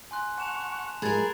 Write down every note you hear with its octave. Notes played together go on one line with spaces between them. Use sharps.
G#5 C6 F#6
F#5 A5 C#6 E7 F7
G#2 F3 G#3 G#4 A#4 B5 G#6 A6